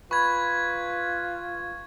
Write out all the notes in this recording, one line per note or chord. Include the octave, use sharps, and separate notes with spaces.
F4 B4 B5 C#6 G#6